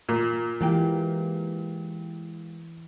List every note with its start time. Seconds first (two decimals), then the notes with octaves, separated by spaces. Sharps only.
0.09 A#2
0.61 E3 G#3 A#3 G4